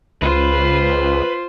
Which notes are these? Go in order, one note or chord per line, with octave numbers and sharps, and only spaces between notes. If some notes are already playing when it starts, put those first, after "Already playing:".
C#2 F4 B4 C5